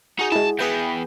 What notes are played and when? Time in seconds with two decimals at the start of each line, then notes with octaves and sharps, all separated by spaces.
0.19 D#4 F#4 G#4
0.32 G#3 E4 A5
0.59 E3 B3 G#4 B4 G5